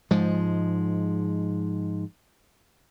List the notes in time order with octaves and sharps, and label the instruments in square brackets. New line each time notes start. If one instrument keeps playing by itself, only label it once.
[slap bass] G#2 F3 G#3